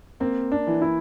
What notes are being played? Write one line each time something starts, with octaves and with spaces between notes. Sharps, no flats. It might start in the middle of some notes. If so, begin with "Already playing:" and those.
A#3 C4
D4
E3
E4